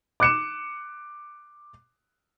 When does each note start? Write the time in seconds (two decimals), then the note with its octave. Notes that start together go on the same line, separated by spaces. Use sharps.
0.20 D6 F#6 C#7 E7